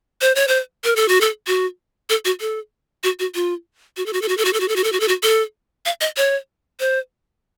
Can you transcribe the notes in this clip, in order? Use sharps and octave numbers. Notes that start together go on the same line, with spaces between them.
C5
C#5
C5
A#4
A4
F#4
A4
F#4
A4
F#4
A4
F#4
F#4
F4
F#4
A4
F#4
A4
F#4
A4
F#4
A4
F#4
A4
F#4
A4
F#4
A4
F#4
A4
F5
D#5
C#5
C5